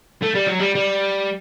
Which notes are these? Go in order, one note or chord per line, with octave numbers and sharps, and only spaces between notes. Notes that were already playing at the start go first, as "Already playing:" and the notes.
A3
G3
F#3
G3
G3